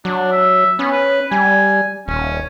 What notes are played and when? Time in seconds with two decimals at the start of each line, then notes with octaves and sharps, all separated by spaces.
0.05 F#3 D4
0.31 E5
0.79 B3 C#4
0.91 B4
1.31 G3 G#5
2.08 D#1 C#4